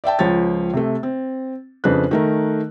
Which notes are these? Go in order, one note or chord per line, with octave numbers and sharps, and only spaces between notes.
D5 E5 G5 A5
C#2 F3 C#5 A6
C3 A3
C4
F2 C#3 D4 B4 C5 F#6
D#3 A3 A#4